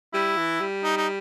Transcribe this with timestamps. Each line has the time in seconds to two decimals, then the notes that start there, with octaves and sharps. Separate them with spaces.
0.14 G3 E4
0.37 E3
0.60 G3
0.84 D#4
0.97 D#4